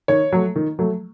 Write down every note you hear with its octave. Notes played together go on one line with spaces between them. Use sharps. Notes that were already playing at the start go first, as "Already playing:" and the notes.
D#3 C#5
F#3 A3
D#3
F#3 A3